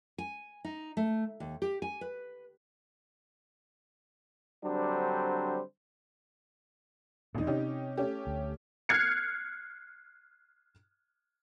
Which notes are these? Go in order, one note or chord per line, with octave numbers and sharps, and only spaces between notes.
G#5
D#4
A3
D#2
G4
G#5
B4
D3 F#3 G3 C4 D4 C5
G#1 E2 A#2 D#4
C3 C#4 D#4 G4
A3 C#4 G4
D2
F6 F#6 G#6 C7 C#7